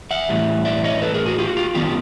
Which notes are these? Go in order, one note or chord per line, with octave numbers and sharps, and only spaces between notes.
E5 F#5
A2 E3 G3
D5 E5
C#5 D#5
A4 B4
G#4 A#4
F#4 G#4
F4 G4
F#4
F4 G4
F#2 D#3 F#3 B3 F4 G4